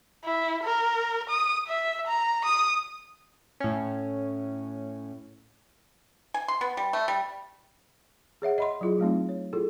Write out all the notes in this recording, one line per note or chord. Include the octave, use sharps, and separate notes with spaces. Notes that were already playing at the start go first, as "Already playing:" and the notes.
E4
A#4
D#6
E5
A#5
D#6
A2 C#4
G#5
C6
B3
G3
A3
G3
G#4 C#5 E5 F#5
D#5 B5 C6
F#3 E4 F4 G#4
F#3 A3 C4 D#4
C#5
E4 F4 G#4 A4